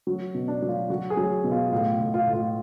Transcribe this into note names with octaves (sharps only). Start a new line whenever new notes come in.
F#3 F#4
B2
D4
F#3
F4
F#3 F#4
G#4
F#3
B2
F4
A2 F4
A2
F4
A2
F4